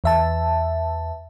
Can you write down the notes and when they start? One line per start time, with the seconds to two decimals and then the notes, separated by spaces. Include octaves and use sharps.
0.04 E2 E5 A5